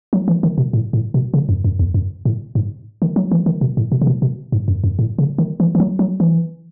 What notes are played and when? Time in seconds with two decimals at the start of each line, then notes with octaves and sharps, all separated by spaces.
0.13 F#3
0.28 E3
0.43 D#3
0.58 B2
0.73 A2
0.93 A2
1.14 B2
1.34 C#3
1.49 F#2
1.64 F#2
1.79 E2
1.94 F#2
2.25 A2
2.55 G#2
3.02 D#3
3.16 F#3
3.32 E3
3.46 D#3
3.61 B2
3.77 A2
3.92 B2
4.01 C#3
4.07 B2
4.22 B2
4.52 G#2
4.68 F#2
4.84 F#2
4.99 A2
5.19 C#3
5.38 D#3
5.60 E3
5.75 E3
5.80 F#3
5.99 F#3
6.20 E3